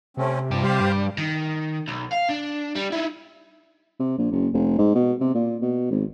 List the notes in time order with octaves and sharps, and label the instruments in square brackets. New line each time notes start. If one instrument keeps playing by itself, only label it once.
[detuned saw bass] C3 [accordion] A3 C4 C#4
[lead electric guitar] G2 G4 [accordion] F3
[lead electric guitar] G3 [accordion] G4 C5 F5
[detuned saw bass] G2
[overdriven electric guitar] D#3
B1
F5
D4
G3
D#4 E4
[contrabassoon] C3
A#1
F#1
F1
G#2
B2
C3
A#2
B2
G#1